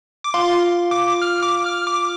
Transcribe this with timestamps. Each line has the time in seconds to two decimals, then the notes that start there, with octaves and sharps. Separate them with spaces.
0.24 D6
0.34 F4 C6
0.91 D6
1.22 F6
1.43 D6
1.65 F6
1.87 D6